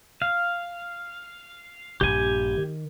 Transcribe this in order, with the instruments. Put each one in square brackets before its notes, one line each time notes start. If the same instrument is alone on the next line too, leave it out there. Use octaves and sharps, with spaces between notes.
[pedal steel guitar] F5
[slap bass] A#1 G2 A#2 [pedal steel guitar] G4 G#5
[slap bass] D#3